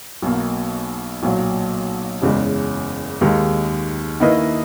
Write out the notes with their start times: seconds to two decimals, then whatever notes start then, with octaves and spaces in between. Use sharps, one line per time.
0.22 B1 B2 A#3
1.23 B1 A#2 F#3
2.22 F#1 E2 C#3 G#3
3.21 D#2 D#3 G#3 D#4
4.20 D#3 A#3 E4 B4 D#5